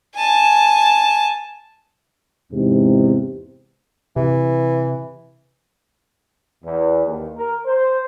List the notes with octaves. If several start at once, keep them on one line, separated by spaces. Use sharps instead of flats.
G#5 A5
E2 G#2 C3
C3 E3
E2
D#2
A#4
C5